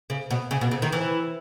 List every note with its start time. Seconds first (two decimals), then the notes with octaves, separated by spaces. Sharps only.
0.10 C#3
0.31 B2
0.51 C#3
0.61 B2
0.71 C#3
0.82 D#3
0.92 E3